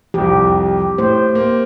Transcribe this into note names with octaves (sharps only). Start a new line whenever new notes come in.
C2 F2 G4
A2 C5
A#3